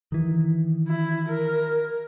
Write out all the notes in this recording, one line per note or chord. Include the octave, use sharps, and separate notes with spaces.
D#3 E3
E4
A#4